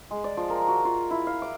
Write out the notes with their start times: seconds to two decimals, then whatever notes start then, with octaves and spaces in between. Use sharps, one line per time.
0.11 G#3
0.24 D5
0.37 F3
0.50 A#4
0.68 F#4
0.85 F4
1.11 E4
1.27 F5
1.42 D6